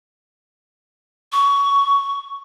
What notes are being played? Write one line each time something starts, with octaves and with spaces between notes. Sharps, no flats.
C#6